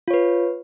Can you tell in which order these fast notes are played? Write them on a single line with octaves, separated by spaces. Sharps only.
F4 C#5 B4